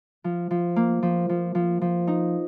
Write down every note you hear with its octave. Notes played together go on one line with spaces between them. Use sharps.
F3
F3
A#3
F3
F3
F3
F3
D#4